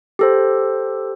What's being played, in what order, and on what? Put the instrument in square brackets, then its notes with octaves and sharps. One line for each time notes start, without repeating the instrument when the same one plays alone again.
[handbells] G4 A4 C5